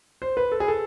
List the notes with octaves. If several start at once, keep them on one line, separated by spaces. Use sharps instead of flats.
C5
B4
A4
G#4
A4